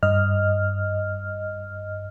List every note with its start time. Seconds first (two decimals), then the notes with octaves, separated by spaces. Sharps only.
0.03 G2 D#5 F6